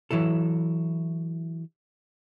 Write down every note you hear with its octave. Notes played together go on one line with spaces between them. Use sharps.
E3 F#3 E4 A4